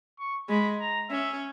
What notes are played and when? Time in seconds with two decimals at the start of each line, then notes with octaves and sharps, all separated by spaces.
0.19 C#6
0.49 G#3 B5
0.80 A#5
1.10 C#4 E5